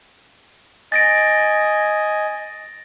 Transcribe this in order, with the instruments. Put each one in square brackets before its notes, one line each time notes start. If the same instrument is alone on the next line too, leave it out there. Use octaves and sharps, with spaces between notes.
[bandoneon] D#5 G#5 [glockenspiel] A6 A#6 D7